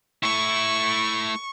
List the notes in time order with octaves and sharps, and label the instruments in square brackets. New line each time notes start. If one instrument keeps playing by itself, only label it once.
[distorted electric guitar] A3 E4 [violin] C#6